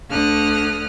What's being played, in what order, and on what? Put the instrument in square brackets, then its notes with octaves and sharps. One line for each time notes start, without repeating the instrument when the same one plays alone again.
[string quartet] D2 D3 D#6 F6 F#6